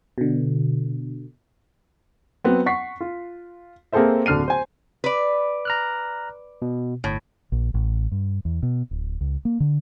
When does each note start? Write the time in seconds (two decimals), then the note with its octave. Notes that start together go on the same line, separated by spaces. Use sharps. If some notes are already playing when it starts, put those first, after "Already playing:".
0.18 B2 D3
2.44 F#3 B3 C4
2.66 F#5 C#6 B6 C7
3.00 F4
3.92 A#3 C4 G#4 A4 C5 E5
4.26 D1 D3 F6 C7 D#7
4.48 C5 G#5
5.04 B4 D5
5.65 A#5 F6 F#6
6.62 B2
7.04 G1 A2
7.52 A#1
7.74 A1
8.12 G2
8.45 E2
8.63 B2
8.91 D1
9.21 C#2
9.45 A#3
9.60 D3